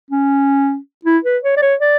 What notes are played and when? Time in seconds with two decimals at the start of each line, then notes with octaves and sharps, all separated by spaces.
0.11 C#4
1.05 E4
1.24 B4
1.43 C#5
1.57 D5
1.62 C#5
1.80 D5